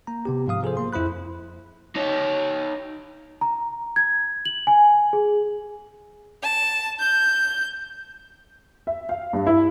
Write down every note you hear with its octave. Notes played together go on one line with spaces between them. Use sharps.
A#3 A#5
C3 B3 G4
G#2 F3 F5 D#6
F3 G#4 A4 C5
A#3 C6
F2 E4 C5 B5 F#6
D#4 C#5
A#5
G#6
F#7
G#5
G#4
A5
G6
E5
F5
G2
E4